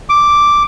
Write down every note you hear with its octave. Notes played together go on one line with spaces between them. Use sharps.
D6